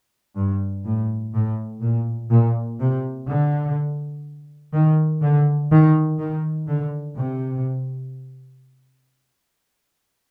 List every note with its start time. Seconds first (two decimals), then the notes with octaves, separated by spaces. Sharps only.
0.36 G2
0.85 A2
1.34 A2
1.82 A#2
2.31 A#2
2.80 C3
3.28 D3
4.74 D#3
5.22 D3
5.72 D#3
6.19 D#3
6.68 D3
7.17 C3